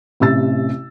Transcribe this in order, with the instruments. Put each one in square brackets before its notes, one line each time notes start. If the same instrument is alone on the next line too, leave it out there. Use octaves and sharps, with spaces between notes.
[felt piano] A1 C3 E6 A6